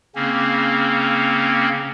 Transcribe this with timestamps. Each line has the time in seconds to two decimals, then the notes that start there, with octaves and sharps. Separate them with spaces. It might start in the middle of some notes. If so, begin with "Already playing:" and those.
0.15 C#3 A#3 C4 C#4